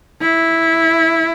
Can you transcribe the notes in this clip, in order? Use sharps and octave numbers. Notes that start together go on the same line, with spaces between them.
E4